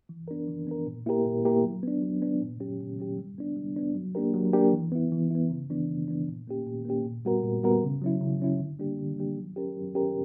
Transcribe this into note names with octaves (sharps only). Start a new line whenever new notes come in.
E3
B3 D4 A#4
E3
B3 D4 A#4
A#2
A#3 E4 G4 A#4
A#2
A#3 E4 G4 A#4
F#3
B3 D4
F#3
B3 D4
A#2
F#3 C#4 G4
A#2
F#3 C#4 G4
G3
B3 D4
G3
B3 D4
F#3
A#3 D4 G4 A#4
F#3
A#3 D4 G4 A#4
E3
B3 E4
E3
B3 E4
C#3
E3 B3 D4
C#3
E3 B3 D4
A#2
A#3 C#4 G4
A#2
A#3 C#4 G4
A#2
G3 B3 F#4 A#4
A#2
G3 B3 F#4 A#4
C#3
F#3 C#4 E4
C#3
F#3 C#4 E4
D3
G3 A#3 D4 G4
D3
G3 A#3 D4 G4
F#3
C#4 G4 A#4
F#3
C#4 G4 A#4